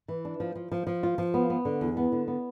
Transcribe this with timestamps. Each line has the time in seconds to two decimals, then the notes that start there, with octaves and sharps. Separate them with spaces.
0.08 E3
0.25 D4
0.40 F3
0.56 F3
0.72 F3
0.87 F3
1.03 F4
1.18 F3
1.34 B3
1.50 B3
1.65 D3
1.81 E2
1.97 B3
2.12 D3
2.28 B3